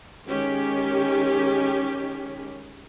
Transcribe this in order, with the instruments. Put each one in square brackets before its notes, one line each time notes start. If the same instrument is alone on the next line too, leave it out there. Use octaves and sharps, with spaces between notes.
[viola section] D#3 G#3 C#4 G4